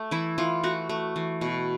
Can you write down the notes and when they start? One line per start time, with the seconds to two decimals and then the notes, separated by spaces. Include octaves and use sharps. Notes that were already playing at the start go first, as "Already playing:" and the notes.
Already playing: A3
0.11 E3 E4
0.38 E3 F4
0.63 A3 F#4
0.89 A3
1.16 E3
1.41 B2